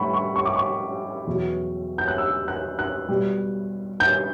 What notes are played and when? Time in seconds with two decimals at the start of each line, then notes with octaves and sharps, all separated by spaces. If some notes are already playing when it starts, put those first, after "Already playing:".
Already playing: A2 G3 F#5 B5 C#6
0.13 C#6
0.36 C#6
0.45 D6
0.56 C#6
1.27 E2 B2 F#3
1.98 G6
2.08 F#6
2.18 E6
2.48 F#6
2.79 F#6
3.09 B2 G3
4.00 G6